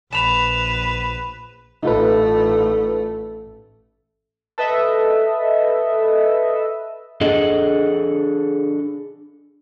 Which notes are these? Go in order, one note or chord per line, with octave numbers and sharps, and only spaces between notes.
A#1 B4 A5 B5 E7 F7
A1 A3 D#4 F4 B4
A4 B4 D#5 E5
D4 G#4 A4 D#5